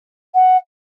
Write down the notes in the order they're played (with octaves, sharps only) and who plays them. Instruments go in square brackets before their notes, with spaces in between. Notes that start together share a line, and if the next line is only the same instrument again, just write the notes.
[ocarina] F#5